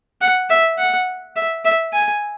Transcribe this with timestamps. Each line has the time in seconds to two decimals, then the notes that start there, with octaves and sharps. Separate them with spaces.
0.21 F#5
0.50 E5
0.78 F#5
1.36 E5
1.65 E5
1.93 G#5